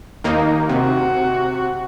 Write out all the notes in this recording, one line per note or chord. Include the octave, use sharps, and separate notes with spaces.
D#2 A#3 D#4
C3 F#4